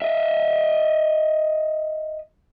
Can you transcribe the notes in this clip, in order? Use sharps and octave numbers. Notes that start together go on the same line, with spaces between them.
D#5 E5